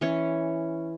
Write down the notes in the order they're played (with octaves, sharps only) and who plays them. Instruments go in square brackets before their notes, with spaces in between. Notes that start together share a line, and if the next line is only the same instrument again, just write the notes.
[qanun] E3 C#4 C#5